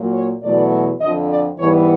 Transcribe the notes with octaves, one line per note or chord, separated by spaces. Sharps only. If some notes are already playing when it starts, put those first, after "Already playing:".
Already playing: A#2 F#3 A#3
C#5
E2 B2 F#3 A3 D5
F2 D3 F3 D#5
D5
G#2 E3 G3 B3 C#5